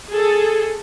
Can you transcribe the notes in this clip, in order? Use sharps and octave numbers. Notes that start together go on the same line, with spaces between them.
G#4 A4